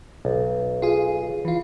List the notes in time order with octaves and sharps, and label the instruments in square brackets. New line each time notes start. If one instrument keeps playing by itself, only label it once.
[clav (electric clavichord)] B1
[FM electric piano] F4 G#4
E3 F4